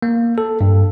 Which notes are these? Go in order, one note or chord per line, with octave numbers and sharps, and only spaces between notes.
A#3
A4
G2